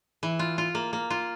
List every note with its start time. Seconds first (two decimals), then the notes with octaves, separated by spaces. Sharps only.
0.23 E3
0.39 F4
0.58 F4
0.75 A#3
0.93 A#3
1.10 F4